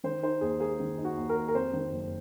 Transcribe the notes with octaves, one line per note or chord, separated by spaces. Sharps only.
D#3 C5
D#4 C5
D#2 G#4
A#3 G#4
D#3
D#4
F#4
D#2
A#4
A#3
A#4
F2 C5
D#3
F#1